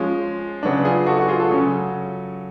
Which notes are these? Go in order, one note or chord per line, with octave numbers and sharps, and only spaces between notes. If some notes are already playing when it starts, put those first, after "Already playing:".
Already playing: F3 G#3 C#4 F4
C#3 F#3 B3 D4
F4 G#4
F#4 A4
F#4
F4 G#4
F#4 A4
C#3 F#3 C#4